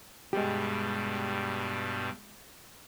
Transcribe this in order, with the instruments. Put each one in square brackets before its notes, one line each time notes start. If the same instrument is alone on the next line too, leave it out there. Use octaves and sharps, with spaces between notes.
[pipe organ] G2 B2 G3 [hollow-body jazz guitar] G#3 G4